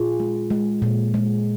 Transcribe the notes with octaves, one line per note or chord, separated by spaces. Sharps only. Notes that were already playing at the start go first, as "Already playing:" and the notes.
Already playing: A#2 F4 G#4
G#3
G#3
A#2
G#3